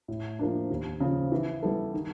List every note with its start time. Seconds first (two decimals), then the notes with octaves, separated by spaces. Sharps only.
0.08 A2
0.39 F3 A#3 D4
0.70 D#2
1.00 C#3 F3
1.32 E3
1.62 G3 B3 E4 A4
1.93 D#3